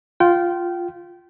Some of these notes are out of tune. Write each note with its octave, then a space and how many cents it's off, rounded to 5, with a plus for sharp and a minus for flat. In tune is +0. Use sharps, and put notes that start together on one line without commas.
F4 +0 G5 -25